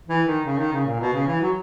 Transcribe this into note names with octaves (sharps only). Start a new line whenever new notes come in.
E3
D#3
C#3
D#3
C#3
A#2
B2
C#3
E3
F#3